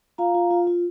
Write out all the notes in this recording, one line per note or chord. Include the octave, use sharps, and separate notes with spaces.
F4 F5 A#5
F4
F4
F4